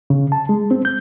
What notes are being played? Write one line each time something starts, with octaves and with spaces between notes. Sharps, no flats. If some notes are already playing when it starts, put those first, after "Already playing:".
C#3
A5
G#3
C4
G6